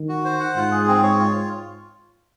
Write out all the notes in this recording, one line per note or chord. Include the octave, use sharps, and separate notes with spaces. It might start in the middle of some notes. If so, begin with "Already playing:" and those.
Already playing: D#3
F#4
C5
F#5
G#2 F4
G#4
C4
C#5
F4